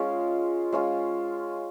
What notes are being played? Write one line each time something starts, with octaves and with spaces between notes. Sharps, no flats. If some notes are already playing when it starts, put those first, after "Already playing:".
Already playing: G#3 C#4 F4
G#3 C#4 F4